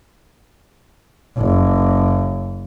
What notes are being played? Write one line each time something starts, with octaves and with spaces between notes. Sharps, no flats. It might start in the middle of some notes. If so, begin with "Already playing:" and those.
F#1